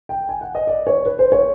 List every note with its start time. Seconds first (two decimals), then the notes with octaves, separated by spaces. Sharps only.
0.09 G5
0.29 G#5
0.41 F#5
0.55 D#5
0.67 D5
0.87 C#5
1.06 B4
1.19 C5
1.32 C#5